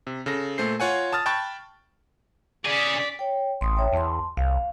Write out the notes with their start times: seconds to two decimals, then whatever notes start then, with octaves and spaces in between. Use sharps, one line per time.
0.07 C3
0.26 C#3 A4 A#6
0.58 A#2 A3 C5 C7
0.80 F4 C#5 F#5 G#5
1.13 A5 D#6 F6 A6
1.26 G5 A5 B5 C#6 F#6 A6
2.65 C#4 G#4 D5 B6
3.19 C#5 G5
3.61 A1 C6 D#6
3.77 C#5 E5 G5
3.93 E2 A5 C6
4.37 C2 F5